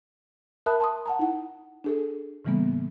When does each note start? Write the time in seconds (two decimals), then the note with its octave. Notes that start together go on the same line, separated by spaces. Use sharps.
0.66 A#4 E5 A5 B5 D#6 F#6
0.80 A5 C6 D#6
1.06 F#5 A5 A#5
1.19 D#4 E4 F#5
1.84 D4 G#4 A4
2.45 A2 C#3 E3 G3 A#3 B3